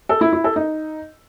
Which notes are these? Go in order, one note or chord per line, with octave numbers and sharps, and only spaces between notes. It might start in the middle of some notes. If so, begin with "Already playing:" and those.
A4
E4
E4
A4
D#4